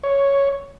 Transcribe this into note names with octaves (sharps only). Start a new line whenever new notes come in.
C#5